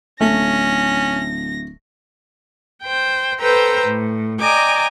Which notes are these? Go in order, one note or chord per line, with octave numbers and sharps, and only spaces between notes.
D1 A3 C#4 A#6
C5 G5
A4 B4 C5 G5 A#5 E6
A2
D5 D#5 G5 G#5 A#5 D6